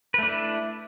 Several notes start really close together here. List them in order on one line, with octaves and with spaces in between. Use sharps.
B4 A3 D4 E4